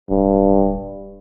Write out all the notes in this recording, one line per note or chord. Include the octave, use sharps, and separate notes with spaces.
D1 G2